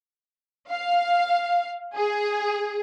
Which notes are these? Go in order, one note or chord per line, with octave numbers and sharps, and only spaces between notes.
F5
G#4